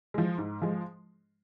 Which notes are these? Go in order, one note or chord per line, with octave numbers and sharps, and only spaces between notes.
F3 G#3
G#2
F3 G#3